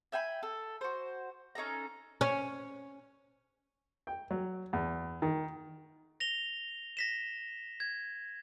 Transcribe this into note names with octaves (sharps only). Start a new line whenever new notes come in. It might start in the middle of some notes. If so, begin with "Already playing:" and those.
E5 G5 G#5 B5
A4
F#4 C5
C#4 D#4 A4 A#5
C#4
G5
F#3
E2
D#3
A#6 F7 G7
A#6 B6 E7
G#6